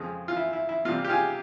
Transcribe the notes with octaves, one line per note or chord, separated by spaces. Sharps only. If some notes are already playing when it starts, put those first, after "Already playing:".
Already playing: F2 C#3 F3 G#3
F4
E4
E4
E4
C3 G3 A#3 F4
G4
F4 G#4